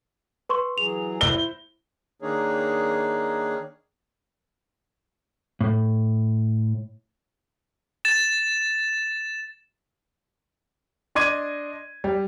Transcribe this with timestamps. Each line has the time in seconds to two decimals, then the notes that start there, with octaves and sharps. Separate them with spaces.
0.49 B4 C6 C#6
0.78 E3 F#3 G#4 F7
1.21 E4 C5 G7
2.22 D#3 A#3 D4 D#4 G#4 C#5
5.61 A2
8.05 A6 E7
11.15 D4 D#5 C6 D6 G#6 D#7
12.04 G3